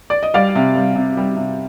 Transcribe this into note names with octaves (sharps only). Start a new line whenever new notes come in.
D5
D#5
G3 D5 F5
C3
G3
C3
G3
C3